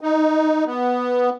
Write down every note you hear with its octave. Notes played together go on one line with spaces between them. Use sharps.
D#4
B3